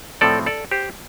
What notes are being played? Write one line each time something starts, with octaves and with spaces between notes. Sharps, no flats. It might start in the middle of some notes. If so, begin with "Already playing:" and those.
A2 F3 A3 C4 A4 D5
A4 D5
G4 C5